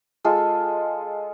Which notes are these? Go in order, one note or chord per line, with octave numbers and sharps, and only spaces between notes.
G#3 F4 A4